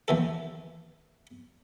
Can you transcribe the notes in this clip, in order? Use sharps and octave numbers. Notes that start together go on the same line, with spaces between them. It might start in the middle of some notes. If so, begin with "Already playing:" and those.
D#2 E3 A4